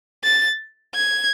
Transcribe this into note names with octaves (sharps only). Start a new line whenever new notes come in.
A6
G#6